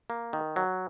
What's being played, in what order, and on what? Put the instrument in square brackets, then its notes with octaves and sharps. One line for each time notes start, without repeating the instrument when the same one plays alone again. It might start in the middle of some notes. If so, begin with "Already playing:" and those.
[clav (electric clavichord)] A#3
D#3
F#3